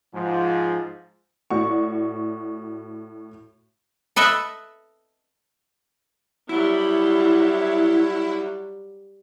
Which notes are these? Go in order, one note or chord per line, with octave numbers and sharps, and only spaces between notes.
G#2 F3
A2 F#4 D5 F#5 C#6
A4 B4 D#5 E5
F#3 G3 E4